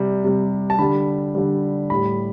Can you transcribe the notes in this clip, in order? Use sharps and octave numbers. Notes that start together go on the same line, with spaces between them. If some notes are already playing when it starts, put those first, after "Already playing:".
Already playing: C3 G3
C3 G3
A5
D3 G3 B5
D3 G3
A2 G3 B5